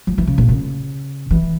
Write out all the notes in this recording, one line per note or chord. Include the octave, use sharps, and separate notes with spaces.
F3
E3
C#3
A#2
C#3
E3